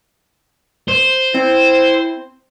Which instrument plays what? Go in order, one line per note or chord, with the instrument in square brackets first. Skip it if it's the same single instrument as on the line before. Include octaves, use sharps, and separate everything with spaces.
[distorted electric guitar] C5
[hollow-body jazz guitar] C4 [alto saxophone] E4